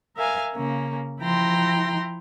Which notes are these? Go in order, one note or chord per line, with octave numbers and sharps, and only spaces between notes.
A#4 E5 F5 G#5
C#3 A#3 C#4
F3 E4 G5 A#5 C6 A#6